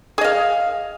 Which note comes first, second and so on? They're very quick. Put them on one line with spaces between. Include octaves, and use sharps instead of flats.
G#4 D#5 F5